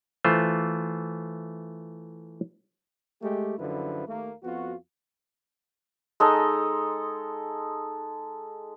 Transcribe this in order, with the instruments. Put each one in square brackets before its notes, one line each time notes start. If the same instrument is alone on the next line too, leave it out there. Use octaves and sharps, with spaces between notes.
[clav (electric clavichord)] E3 A3 F4 C5
[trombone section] G#3 A3 G4
F#2 D3 F3 E4 B4
D#2 A3 A#3
F2 B3 F4 F#4
[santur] G#3 D#4 A4 D#5